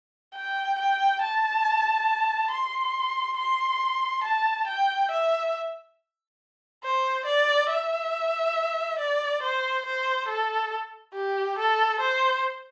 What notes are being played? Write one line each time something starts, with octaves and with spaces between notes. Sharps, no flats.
G5
G5
A5
C6
C6
A5
G5
E5
C5
D5
E5
D5
C5
C5
A4
G4
A4
C5